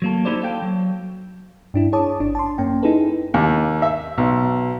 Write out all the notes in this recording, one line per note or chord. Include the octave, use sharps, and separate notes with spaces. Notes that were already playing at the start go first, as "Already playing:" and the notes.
F#3 A#3 A4
A#3 D#4 E4 G4 C5 D5
A4 F5 G5
F#3
G2 D4 E4
G#4 C#5 A5 D6 D#6
G#1 D4
A5 C6
F#2 A#3 C#4 G5
D#4 E4 G#4 A4 B4
D#2
E5
B1